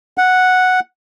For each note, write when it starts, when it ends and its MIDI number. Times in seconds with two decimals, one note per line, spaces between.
0.18 0.80 78